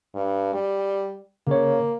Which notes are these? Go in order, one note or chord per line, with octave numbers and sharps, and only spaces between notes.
G2
G3
C#3 A#3 C#5